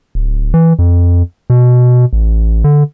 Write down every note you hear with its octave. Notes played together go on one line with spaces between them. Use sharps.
D1
E3
F2
B2
A1
D3